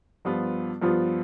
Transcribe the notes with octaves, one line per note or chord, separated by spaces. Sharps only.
G2 F3 B3 F4
G2 F3 B3 F4